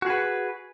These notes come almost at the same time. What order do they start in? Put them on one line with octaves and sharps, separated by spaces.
F#4 G#4 B4